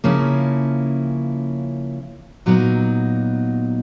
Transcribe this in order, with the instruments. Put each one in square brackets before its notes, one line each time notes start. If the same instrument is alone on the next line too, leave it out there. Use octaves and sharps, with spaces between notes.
[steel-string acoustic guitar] C#3 F3 A#3 C#4 E4
A#2 F#3 B3 D#4